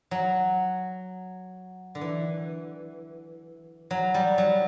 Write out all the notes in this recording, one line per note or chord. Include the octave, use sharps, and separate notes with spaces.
F#3
D3
E3
F#3
G3
F#3